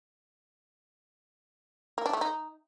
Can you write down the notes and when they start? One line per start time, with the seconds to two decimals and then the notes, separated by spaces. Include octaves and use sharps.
1.98 A#3
2.06 D4
2.13 A3
2.21 D#4